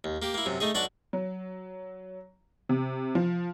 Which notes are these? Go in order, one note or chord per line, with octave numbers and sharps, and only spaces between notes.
D#2
A#3 G4
A#3 E4
F#2 C3
A3 D#4 G#4
B1 D4 F#4 F#5 A5
F#3
C3
F3